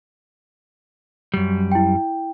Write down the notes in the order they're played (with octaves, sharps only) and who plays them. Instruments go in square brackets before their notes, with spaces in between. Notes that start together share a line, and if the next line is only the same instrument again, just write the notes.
[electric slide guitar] F#2 G3
[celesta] E4 G5